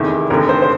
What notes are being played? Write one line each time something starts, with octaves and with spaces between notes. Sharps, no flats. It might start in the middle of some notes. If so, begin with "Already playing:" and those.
Already playing: F1 E2 C3 D#3
F1 D#2 D3 A#4
C5
C5